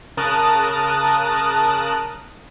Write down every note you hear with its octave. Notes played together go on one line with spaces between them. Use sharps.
C#3 A#4 A5 D#6 F#6